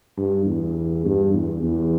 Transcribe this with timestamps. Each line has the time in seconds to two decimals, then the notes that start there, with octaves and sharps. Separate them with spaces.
0.17 G2
0.46 E2
1.05 G2
1.34 E2
1.63 E2